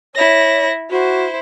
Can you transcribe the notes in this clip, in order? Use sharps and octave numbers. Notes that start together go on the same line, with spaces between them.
E4 C#5 A#6
E4 F#4 C5